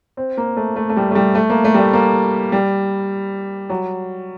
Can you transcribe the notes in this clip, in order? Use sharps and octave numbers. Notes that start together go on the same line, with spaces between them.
C4
A#3
A3
A3
A3
G3
A3
G3
A3
A#3
A3
G3
A3
A#3
G3
F#3